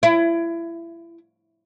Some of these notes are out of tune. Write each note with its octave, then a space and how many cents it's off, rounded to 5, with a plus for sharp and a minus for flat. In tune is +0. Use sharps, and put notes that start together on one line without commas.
E4 +25